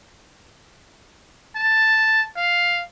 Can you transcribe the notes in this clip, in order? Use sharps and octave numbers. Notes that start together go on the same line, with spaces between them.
A5
F5